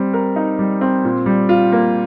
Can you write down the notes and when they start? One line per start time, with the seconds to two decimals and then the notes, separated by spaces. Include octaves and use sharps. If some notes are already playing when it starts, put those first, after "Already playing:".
Already playing: G3 C4
0.13 A#4
0.36 D#4
0.59 G3
0.81 C4
1.04 A#2
1.26 G3
1.49 F4
1.72 A#3